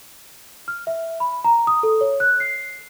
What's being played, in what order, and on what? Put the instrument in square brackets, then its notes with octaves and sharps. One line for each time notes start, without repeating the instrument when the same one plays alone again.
[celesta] F6
E5
B5
A#5
D#6
A4
C#5
F#6
C7